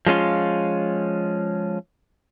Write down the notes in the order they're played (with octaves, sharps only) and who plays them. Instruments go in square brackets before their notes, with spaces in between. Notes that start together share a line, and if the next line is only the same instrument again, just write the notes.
[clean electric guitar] F3 G#3 C#4 F4